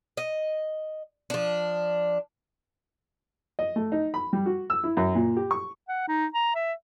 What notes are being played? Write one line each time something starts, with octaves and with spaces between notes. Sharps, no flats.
D#5
F3 D4
D#5
A3
D#4
B5
G3
F#4
E6
E4
F#2
A#2
G4
C#6
F#5
D#4
A#5
E5